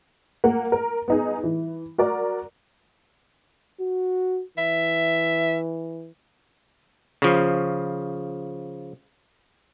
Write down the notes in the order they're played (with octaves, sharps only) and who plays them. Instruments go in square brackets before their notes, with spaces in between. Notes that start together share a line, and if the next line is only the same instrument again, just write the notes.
[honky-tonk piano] A#3 F#5
A#4
B3 D#4 G#4
E3
F#4 A#4 D5
[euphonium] F#4
[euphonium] E3 [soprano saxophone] E5
[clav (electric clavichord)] C#3 F3